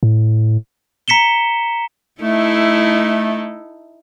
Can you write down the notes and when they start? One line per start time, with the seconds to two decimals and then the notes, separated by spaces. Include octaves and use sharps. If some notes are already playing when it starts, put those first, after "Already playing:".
0.03 A2
1.08 A#5 B6 C#7 E7 G7
2.22 A3 D#4 E4 A4